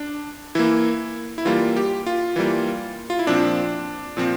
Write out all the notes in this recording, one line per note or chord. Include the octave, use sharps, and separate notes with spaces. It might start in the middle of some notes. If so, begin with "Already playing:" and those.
Already playing: D4
E3 A#3 E4
E4
E3 G3 A#3 F4
G4
F4
E3 G3 A#3
F4
E4
A#2 F3 C4 D4
A#2 F3 C4